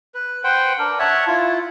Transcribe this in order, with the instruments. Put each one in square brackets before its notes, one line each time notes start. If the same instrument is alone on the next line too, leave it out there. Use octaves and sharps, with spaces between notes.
[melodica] B4
B4 C5 F#5 G5
D4 A#4
C#5 E5 F#5 A5
E4 F4